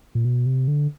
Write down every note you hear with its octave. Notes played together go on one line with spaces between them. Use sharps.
A#2
B2
C3
D3